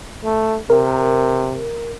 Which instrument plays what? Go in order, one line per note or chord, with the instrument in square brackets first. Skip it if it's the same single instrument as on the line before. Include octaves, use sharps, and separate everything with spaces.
[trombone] A3
[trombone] C3 [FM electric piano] A#4